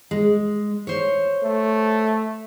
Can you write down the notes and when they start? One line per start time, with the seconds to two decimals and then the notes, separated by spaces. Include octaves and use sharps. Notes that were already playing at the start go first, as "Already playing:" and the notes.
0.11 G#3
0.87 C5 C#5
1.44 A3